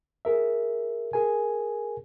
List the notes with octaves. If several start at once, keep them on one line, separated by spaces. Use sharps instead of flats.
G#4 A#4 E5
G#4 A#4 G#5